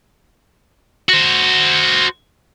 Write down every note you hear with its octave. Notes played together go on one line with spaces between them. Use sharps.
F#4 C5